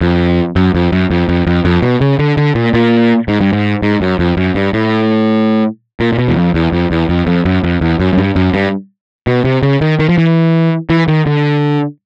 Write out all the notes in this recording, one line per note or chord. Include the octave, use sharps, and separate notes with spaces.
F2
F#2
F2
F#2
F2
F2
F2
F2
B2
C#3
D3
D3
A#2
A#2
G#2
G2
G#2
G#2
F#2
F2
F#2
G2
A2
A#2
A#2
B2
E2
F2
E2
F2
E2
F2
F2
F#2
F2
E2
F#2
F#2
G2
F#2
G2
B2
C3
C#3
D#3
D#3
F3
E3
E3
D#3
D3